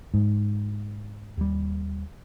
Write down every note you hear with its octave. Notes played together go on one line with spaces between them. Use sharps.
G#2
D#2 G3